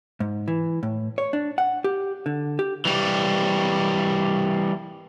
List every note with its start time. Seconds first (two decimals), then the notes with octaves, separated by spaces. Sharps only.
0.20 G#2
0.48 E3
0.83 A2
1.18 C#5
1.33 D4
1.58 F#5
1.84 G4
2.26 D3
2.59 G4
2.85 E3 G3